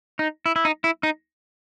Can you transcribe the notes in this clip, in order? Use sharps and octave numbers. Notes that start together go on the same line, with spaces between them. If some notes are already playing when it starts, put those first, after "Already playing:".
D#4
E4
E4
D#4
E4
D#4